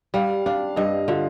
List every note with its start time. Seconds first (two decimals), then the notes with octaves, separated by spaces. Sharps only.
0.14 G3 F5
0.46 D4 F5
0.76 G2 D#5
1.08 D3 F4